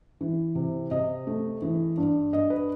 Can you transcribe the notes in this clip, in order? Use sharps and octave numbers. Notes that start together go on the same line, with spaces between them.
E3
C3
C3 D#5
A3
E3
G2
G2 D#5
B4